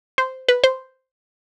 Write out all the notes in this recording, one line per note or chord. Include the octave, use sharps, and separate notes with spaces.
C5
B4
C5